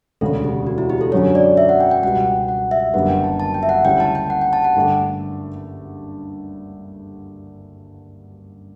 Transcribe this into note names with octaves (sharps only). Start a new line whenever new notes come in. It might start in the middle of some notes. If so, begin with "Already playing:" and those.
E1 D2 C#3 A4
G4
F#4
E4
G4
A4
F#2 D3 F#3 C#4 C#5
D5
E5
F#5
G5
G5
C#2 B2 G3 F#5
F#5
E5
F#1 F#2 D3 G3 B3 F#5
G5
A5
A5
G5
E5
F#5
D2 C#3 G3 C#4 E4 G5
A5
G5
F#5
G5
A5
F#5
G2 D3 A3 D4